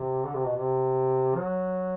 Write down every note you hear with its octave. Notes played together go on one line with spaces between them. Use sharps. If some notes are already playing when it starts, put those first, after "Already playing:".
Already playing: C3
D3
C3
B2
C3
F#3